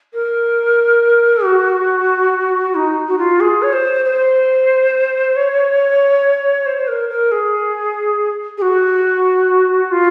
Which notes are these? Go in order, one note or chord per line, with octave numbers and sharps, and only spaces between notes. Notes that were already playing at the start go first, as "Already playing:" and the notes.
A#4
F#4
D#4
F#4
F4
G#4
C#5
C5
C5
C#5
C5
C5
A#4
A#4
G#4
G#4
F#4
F4